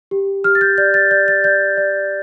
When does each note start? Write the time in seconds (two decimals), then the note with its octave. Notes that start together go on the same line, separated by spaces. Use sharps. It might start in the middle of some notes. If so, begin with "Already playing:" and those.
0.11 G4
0.44 G4 F6
0.55 A6
0.61 G6
0.78 D5 G6
0.94 A6
1.11 D5 G6
1.28 A6
1.44 D5 G6
1.77 D5